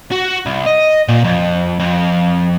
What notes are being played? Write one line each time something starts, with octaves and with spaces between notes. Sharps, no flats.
F#4
C2
D#5
A#2
F2
F2